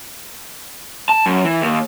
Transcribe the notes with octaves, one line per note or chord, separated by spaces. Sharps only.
A5
F#2
E3
D#2